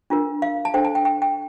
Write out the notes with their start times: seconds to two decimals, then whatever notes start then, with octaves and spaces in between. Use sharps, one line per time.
0.10 D4 F4 A#4
0.42 F5
0.65 A5
0.74 D4 A4 C5 G5
0.85 A5
0.95 G5
1.05 G5
1.22 G5